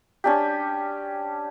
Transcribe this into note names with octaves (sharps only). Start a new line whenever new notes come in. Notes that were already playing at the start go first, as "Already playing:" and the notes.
C#4 D4 G4